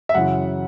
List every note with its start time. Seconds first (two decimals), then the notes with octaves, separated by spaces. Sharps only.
0.09 E5
0.14 F#2 C#3 E3 F#5